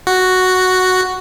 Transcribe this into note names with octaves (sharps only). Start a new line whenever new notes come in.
F#4